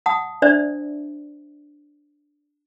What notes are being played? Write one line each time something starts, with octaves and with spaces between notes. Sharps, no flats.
F#5 A5 D#6
D4 C5 D5 E5